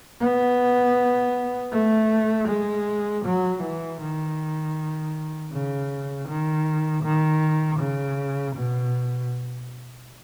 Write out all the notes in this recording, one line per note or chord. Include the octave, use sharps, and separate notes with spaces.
B3
A3
G#3
F#3
E3
D#3
C#3
D#3
D#3
C#3
B2